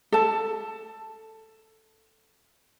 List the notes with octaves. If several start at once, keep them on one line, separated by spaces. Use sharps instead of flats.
A4 A5